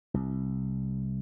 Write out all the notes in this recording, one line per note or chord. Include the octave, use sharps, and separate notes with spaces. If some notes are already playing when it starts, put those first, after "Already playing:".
C2